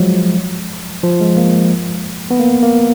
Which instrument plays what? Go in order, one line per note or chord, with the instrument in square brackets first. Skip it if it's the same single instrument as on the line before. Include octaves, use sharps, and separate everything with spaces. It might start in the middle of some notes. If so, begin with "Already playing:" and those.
Already playing: [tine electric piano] F3 F#3 G#3
F3
G#3
A#3
B3
A#3
A#3